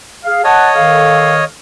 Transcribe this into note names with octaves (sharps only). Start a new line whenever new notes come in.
G#4 F5
C#5 D#5 F#5 A5
D#3 A4 F5